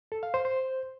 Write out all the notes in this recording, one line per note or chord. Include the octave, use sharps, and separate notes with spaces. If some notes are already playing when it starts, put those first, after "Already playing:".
A4
F5
C5
C5